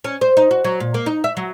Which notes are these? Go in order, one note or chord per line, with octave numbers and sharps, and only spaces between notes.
C#4
C5
D#4
F#4
F#3
A#2
A#3
D#4
E5
F#3